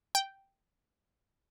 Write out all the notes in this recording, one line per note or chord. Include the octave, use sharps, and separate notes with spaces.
G5